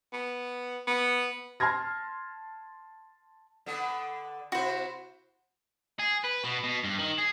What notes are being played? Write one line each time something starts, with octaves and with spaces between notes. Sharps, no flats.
B3
B3
A5 C6 F6 G#6 A#6
D3 B3 A4
C3 E4 F#4 C5
G#4
B4
B2
B2
G2
D#3
G#4